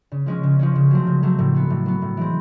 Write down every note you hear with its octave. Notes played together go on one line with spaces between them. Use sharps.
C#3
F3 G#3 C#4
C#3
F3 G#3 C#4
C#3
F#3 A3 C4
C#3
F#3 A3 C4
A2
F#3 B3
A2
F#3 B3
A2
E3 G#3 C4